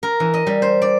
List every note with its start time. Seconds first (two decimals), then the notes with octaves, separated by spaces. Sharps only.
0.03 A#4
0.20 E3
0.34 D#5
0.47 G3
0.62 C5
0.82 D5